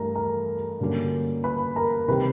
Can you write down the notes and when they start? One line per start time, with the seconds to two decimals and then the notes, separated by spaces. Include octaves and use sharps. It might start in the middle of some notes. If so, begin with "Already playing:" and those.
Already playing: G2 E3 A3 A#4 A#5
0.15 A#4 A#5
0.80 G2 D3 F#3 A#3 C#4
1.44 B4 B5
1.76 A#4 A#5
2.08 C3 D#3 G3 C4 B4 B5